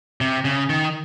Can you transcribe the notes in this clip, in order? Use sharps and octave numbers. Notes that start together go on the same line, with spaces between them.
C3
C#3
D#3